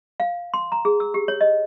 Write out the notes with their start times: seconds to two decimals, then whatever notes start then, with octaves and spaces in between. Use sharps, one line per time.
0.20 F5
0.54 C6
0.72 A#5
0.85 G#4
1.00 E6
1.14 G4
1.28 C#5
1.41 D#5